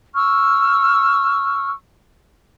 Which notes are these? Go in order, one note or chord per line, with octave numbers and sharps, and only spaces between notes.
C#6 E6 F6